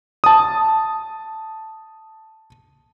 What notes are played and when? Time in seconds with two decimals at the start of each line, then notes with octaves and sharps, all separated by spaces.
0.24 A5 D#6